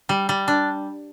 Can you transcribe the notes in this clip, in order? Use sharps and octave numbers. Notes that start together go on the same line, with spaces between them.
G3
G3
D4